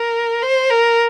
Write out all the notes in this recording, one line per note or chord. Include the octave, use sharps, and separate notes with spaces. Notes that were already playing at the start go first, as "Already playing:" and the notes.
Already playing: A#4
C5
A#4